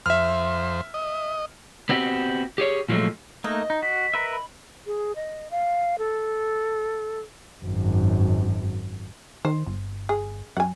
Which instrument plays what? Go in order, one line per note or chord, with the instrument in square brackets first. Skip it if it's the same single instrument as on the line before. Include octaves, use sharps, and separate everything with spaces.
[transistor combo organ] F2 C5 [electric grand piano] E5 F6
[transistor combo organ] D#5
[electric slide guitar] B3 C4 F#4 G4
G4 G#4 C#5
A#2 F3 F#3 G#3 A3
[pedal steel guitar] A3 A#3 D#4 [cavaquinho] D#5
[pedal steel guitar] D#4
[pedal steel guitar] F#4 [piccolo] B6
[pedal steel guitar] A#4 B4 E5
[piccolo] B5
[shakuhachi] G#4
D#5
F5
A4
[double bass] G#1 F#2
[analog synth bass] D#3 [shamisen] C5
[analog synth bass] G1
[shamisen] G#4
[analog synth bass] F#2 [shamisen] F#5 G#5